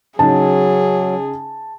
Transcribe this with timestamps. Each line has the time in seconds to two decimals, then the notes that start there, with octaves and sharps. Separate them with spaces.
0.19 C#3 F#3 D#4 G#4 A5